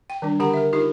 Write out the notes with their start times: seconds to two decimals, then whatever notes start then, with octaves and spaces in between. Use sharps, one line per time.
0.10 G5
0.22 D#3 G3 D4
0.40 D3 G4 F#5 A#5
0.54 A#4 E5
0.73 D#4 F4 G4 A#4